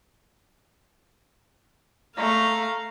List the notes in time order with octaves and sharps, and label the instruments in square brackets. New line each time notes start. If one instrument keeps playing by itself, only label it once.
[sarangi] A3 [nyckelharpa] F5 A#5